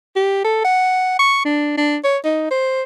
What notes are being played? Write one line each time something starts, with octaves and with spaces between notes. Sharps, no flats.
G4
A4
F#5
C#6
D4
D4
C#5
D#4
C5